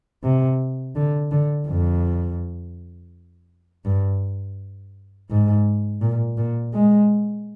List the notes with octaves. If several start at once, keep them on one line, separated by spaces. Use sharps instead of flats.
C3
D3
D3
F2
G2
G#2
A#2
A#2
G#3